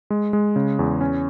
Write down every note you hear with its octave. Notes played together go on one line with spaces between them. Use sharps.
G#3
G#3
C#3
E2
C#4